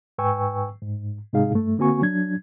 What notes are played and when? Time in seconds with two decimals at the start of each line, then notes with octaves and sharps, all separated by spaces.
0.18 G#2 B4 G5 G#5 C#6 E6
0.83 G#2
1.33 G#2 C3 G#3 D#4 G#4 F5
1.53 G2 A3
1.78 D3 A#3 C4 F#4 G#5 C#6
2.02 F#3 D4 G#6